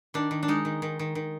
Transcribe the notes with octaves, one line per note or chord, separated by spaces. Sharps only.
D#3 D4
D#3
D4
G#3 D#4
D#3
D#3
D#3
D#3